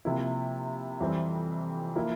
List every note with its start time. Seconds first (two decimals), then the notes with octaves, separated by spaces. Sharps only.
0.05 C3 F3 A#3 E4
1.01 F2 E3 G3 C4
1.96 F3 A#3 E4